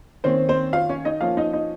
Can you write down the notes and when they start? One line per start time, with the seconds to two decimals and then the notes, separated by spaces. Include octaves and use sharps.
0.24 D#3 A#3 C4 C#4 C5
0.49 C4 C5
0.73 F4 F5
0.89 C#4 C#5
1.05 D#4 D#5
1.21 F3 A#3 C#4 F4 F5
1.37 D#4 D#5
1.53 D#4 D#5